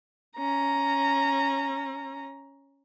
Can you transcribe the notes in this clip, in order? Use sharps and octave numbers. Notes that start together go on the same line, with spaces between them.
C#4 A#5